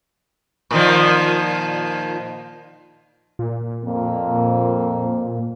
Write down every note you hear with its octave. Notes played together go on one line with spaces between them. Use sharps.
A#2 D#3 F3
A#2
F2 F3 A#3